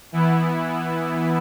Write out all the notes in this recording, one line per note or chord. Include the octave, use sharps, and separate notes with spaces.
E3 B3 E4